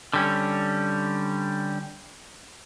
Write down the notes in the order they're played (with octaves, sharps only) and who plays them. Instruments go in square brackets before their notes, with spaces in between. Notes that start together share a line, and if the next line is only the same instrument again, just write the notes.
[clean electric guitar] D3 G3 C#4